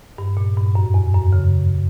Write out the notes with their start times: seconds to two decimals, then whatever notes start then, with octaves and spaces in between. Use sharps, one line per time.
0.18 G2
0.37 A#2
0.57 G2
0.75 F#2
0.94 E2
1.14 F#2
1.33 C#3